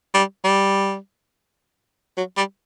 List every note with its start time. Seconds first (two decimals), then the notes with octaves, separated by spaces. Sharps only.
0.14 G3
0.44 G3
2.18 F#3
2.37 G3